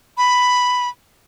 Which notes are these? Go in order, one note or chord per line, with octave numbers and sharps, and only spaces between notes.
B5